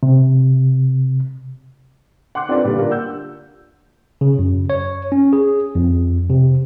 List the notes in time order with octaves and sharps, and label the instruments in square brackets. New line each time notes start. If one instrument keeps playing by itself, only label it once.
[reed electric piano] C3
[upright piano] F#5 C6 D6 F#6
C4 D4 F4 A4 B4 D5
G2 A#2 D3 G3
A#3 D4 F4
F#5 E6 G6
[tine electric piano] C#3
F#2
C#5
C#4
G#4
F2
C3